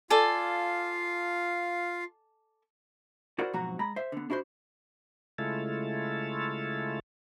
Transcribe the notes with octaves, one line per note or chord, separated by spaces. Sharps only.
F4 A4 D5 F5 G#5
E4 F#4 A#4 C5 D5 F#5
F2 G#2 B2 F#3 F#4 A#5
G#3 A#5 B5
C5 E5
D3 B3
D4 E4 F#4 A4 C5
C#3 G#3 A3 E4 F4 A4